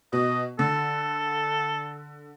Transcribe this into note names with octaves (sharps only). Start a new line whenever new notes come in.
B2 D#5
D3 A4